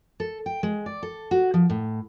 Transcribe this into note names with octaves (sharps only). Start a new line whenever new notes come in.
A4
G5
G#3
D5
A4
F#4
F3
A2